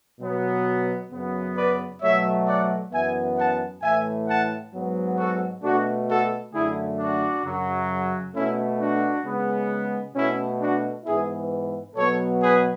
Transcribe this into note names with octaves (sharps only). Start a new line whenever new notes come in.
B2 F#3 B3
F#2 C#3 F#3 B3
B4 D5
B2 F#3 A3 C#5 E5
D5 F#5
F#2 E3 B3 E5 G#5
F#5 A5
A2 E3 A3 E5 G#5
F#5 A5
G#2 F#3 B3
F#4 A4
B2 A3 D4 F#4
F#4 A4
F#2 D3 A3 E4 G#4
D4 F#4
F#2 C#3 F#3
B2 A3 C#4 E4
D4 F#4
C#3 G#3 B3
B2 A3 C#4 E4
D4 F#4
G#2 E3 B3 E4 G#4
B2 F#3 B3 A4 C#5
G#4 B4